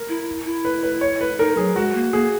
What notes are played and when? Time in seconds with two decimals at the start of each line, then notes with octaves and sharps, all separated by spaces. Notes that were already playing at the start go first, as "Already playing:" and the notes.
Already playing: A#4
0.09 E4
0.45 E4
0.65 B4
0.83 B4
1.01 C#5
1.21 B4
1.39 D#4 A#4
1.57 F#3 G#4
1.76 G#3 F#4
1.95 A#3
2.13 A#3 G#4